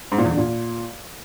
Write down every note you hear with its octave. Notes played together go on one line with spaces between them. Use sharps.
G#2
A#2
E2
D3
A#2